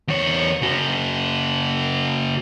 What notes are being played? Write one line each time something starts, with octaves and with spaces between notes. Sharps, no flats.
E2 C#5
C#3 F#4